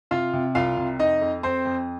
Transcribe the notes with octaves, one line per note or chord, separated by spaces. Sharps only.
C3 F4 F5
C3
C2 F4 F5
C3
F2 D#4 D#5
F2
F2 C4 C5
F2